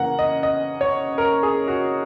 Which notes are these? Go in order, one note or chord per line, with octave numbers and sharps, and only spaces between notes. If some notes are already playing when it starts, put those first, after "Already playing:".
Already playing: C#3 E3 A#3 C#4 F#5 A#5
D#5
D#5
C#5
A#4
G#4
F#4